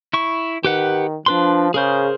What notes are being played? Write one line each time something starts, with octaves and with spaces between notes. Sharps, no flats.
E4 C#6
D#3 G4 B4 F#5
F3 D4 B4 C6
C#3 G#4 A#4 C5